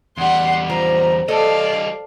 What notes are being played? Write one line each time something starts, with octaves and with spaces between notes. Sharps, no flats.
E2 G3 F#5 C6
F3 A#5
G3 A4 D5 D#5 F5